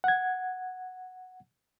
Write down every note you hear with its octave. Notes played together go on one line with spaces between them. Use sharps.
F#5 G#6